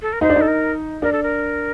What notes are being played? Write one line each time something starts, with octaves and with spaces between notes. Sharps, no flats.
A4
A#4
D#4 C5
D4
D#4
A4
A#4
D4 A#4
A4
A#4